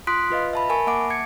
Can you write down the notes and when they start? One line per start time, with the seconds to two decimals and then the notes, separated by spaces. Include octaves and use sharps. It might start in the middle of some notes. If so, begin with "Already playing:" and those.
0.07 F4 C6 D#6 F#6 B6 D7
0.31 F4 B4 D#5 F5
0.53 E5 A5 B5
0.69 A#4 G#5 A5 B5 C#6
0.87 A#3 E5 F#5 D6 D7
1.10 A5 G#6 C#7